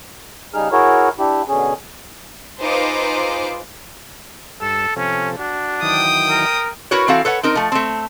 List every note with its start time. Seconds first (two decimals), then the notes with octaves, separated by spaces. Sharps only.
0.54 C#3 G3 D#4 G#4 F6
0.72 E4 F#4 G#4 A#4 C#5
1.19 D4 E4 G4
1.48 B2 D3 C#4 G#4
2.61 D#4 F4 G#4 B4 C5 D6
4.61 G2 A4 E6
4.96 C3 F3 C#4 A4
5.39 D4 F#4
5.82 D#3 E3 F#3 G5 D#6
6.29 A#4
6.91 E4 F#4 A#4 B4 C#5
7.08 E3 C4 F#4 A4 F5
7.25 A4 B4 C#5 F#5
7.43 C4 D#4 A#4
7.55 F3 A3
7.72 A3 C4